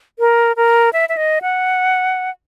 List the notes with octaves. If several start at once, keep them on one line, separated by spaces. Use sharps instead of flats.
A#4
A#4
E5
E5
D#5
F#5